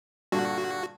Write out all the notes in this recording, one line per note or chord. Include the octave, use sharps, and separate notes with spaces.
G2 A#2 D3 F#4